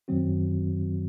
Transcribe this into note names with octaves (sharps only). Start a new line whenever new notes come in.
F#2 D#3 F#3 C4 F#4